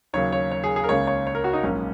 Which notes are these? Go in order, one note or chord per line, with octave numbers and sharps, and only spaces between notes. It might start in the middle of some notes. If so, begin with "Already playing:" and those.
D#2 C#3 F#3 A#3 C#5
C#5
C#5
G#4
G#4
A#4
C#2 C#3 A#3 C#4 C#5
C#5
C#5
A#4
F#4
D#4
A#1 G#2 F#3 A#3 C#4